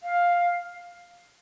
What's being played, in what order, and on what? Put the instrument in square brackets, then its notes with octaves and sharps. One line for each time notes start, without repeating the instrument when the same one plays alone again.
[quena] F5